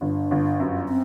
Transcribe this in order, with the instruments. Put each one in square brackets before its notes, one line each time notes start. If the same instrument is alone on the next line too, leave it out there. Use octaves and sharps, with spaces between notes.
[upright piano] G1 [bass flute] D4
[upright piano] G1
F#2
[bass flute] C4